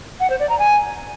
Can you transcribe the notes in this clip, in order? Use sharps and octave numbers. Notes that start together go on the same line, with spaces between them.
F#5
C5
D5
A#5
G#5